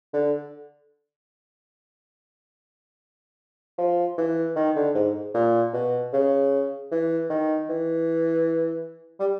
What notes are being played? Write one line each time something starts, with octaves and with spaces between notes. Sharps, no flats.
D3
F3
E3
D#3
D3
G#2
A#2
B2
C#3
E3
D#3
E3
G3